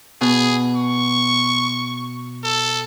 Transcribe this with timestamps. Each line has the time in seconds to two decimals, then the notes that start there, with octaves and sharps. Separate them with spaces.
0.21 B2 G#4
0.76 C#6
2.44 A4